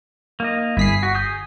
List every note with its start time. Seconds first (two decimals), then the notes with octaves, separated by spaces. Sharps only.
0.40 A#3 D#4 D#5
0.77 G1 E4 G#4 B6 C7
1.03 F#4
1.15 G#4 D#6 G6